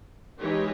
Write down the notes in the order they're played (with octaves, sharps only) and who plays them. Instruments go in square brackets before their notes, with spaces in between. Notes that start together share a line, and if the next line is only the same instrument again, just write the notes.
[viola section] E3 G#3 D#4 G4 C#5